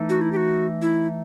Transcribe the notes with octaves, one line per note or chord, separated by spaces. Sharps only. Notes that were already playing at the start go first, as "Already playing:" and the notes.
Already playing: E3 A3 D#4
F#4
E4
G4
F#4
E4